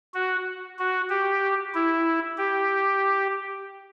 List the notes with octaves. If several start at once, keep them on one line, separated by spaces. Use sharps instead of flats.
F#4
F#4
G4
E4
G4